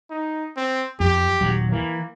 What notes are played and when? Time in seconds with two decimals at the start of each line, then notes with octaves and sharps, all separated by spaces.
0.10 D#4
0.57 C4
1.00 F2 G4
1.41 D#1 F#3
1.72 E3 A#3